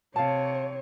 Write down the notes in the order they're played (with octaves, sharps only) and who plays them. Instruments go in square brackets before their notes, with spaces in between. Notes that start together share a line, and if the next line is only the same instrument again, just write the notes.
[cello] C3 [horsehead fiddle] C#5 [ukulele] F5 A5